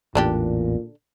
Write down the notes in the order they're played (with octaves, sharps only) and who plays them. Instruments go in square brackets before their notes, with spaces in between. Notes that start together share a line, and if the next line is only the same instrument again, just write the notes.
[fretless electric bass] A1 E2 [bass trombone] A#2 [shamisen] D3 D4 G4